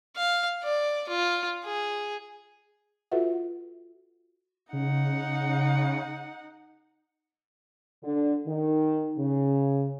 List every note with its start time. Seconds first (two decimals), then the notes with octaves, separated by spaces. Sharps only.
0.17 F5
0.63 D5
1.09 F4
1.65 G#4
3.12 F4 F#4 A4 B4 E5 F#5
4.73 C#3 D#4 F#5
8.03 D3
8.46 D#3
9.18 C#3